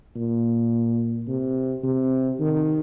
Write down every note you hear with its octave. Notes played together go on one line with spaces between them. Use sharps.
A#2
C3
C3
D#3